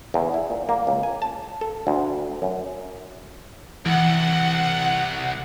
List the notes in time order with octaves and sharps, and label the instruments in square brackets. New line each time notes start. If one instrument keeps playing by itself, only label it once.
[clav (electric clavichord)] E2
E4
A#2
A#3
C#2
G#5
A5
A4
D2
F#2
[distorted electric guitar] C2 [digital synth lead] E3 [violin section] F#5